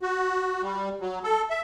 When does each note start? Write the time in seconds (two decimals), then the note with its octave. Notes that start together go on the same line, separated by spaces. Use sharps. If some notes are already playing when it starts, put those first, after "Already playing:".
0.02 F#4
0.62 G3
1.01 F#3
1.24 A4
1.50 E5